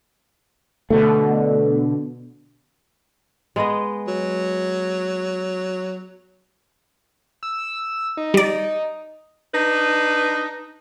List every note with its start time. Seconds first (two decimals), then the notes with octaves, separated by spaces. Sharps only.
0.90 B2 D3 A3
3.56 G#3 B3 D#5
4.08 F#3
7.43 E6
8.17 D#4
8.34 G3 D5
9.54 D4 D#4 B4